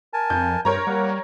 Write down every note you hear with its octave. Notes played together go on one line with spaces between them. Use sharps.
A#4 G#5 A5
F2 G6
G2 A#4 C5 C#5 A#5
G3 A#3 F#5